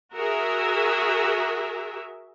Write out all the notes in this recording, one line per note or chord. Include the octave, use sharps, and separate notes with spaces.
F#4 G#4 A#4 E5